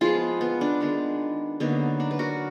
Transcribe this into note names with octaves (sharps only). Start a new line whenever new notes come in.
F3 G#3 B3 F4 G#4
B3
D4
D#3 G#3 B3
D3 F#3 A#3 B3 D#4
D4
B4
F#4 A#4